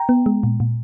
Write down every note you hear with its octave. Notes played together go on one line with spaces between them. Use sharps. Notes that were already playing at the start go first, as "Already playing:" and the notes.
Already playing: G5 A#5
B3
G#3
A#2
A#2